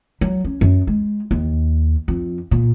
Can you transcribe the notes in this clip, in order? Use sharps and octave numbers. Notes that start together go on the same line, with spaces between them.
F#3
C#4
F#2
G#3
D#2
F2
A#2